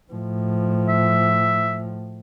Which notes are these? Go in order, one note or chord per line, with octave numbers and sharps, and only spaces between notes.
A2 F3
E5